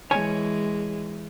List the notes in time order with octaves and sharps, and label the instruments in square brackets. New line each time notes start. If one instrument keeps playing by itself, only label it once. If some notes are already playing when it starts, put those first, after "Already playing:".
[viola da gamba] E3 G#3 [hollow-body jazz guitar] C#5 G#5